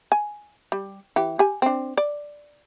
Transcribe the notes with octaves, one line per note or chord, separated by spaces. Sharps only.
G#5
G3
E3 G4
G4 G#5
C4 D4
D5